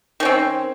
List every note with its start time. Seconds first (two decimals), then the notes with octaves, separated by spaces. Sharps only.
0.20 D#3
0.23 C#4
0.25 C4